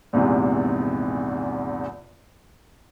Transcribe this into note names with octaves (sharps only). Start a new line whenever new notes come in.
A#1 E2 G#2 C3